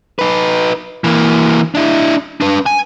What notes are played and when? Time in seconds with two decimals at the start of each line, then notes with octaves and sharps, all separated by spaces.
0.19 D#4 B4
1.04 E3 A#3
1.75 D4 E4
2.41 D4 B4
2.66 G#5